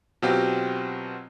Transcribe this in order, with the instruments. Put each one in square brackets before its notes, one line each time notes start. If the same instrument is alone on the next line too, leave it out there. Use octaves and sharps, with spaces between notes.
[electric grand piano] B2 F#3 C4 F4 G4